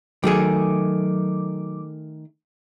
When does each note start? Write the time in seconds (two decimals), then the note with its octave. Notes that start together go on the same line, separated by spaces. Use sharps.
0.24 D#3 F#3 A3 G#4 D6